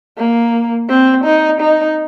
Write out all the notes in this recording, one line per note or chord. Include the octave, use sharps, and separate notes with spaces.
A#3
C4
D#4
D#4